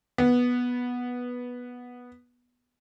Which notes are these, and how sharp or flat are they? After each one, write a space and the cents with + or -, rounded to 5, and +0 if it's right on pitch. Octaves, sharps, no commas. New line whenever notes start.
B3 -10